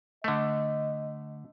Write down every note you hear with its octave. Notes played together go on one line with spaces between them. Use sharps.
D3 A3 D#5